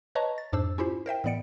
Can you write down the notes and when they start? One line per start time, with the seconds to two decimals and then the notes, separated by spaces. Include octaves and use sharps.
0.15 B4 C#5 D#5 A5 A#5 C#6
0.38 A6
0.53 F2 G#2 D4 C5 E6
0.78 C#4 E4 F4 G4 C5
1.06 A#4 C5 E5 G5
1.24 A2 E3 B3 D5 C#7 D7